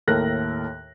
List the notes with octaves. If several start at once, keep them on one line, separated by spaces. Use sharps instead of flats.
D#2 A2 A4 A#4 F#6 A#6